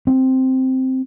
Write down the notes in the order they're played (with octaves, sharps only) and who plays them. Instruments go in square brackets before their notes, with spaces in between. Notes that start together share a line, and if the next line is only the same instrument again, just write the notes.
[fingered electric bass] C4